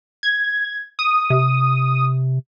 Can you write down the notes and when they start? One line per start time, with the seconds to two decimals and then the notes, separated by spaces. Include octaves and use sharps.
0.23 G#6
0.99 D#6
1.30 C3